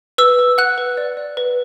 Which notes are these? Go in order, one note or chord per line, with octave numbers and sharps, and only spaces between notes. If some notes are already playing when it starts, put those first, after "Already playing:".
B4 E6
B4
F#5 F#6
B4
D5
D5
B4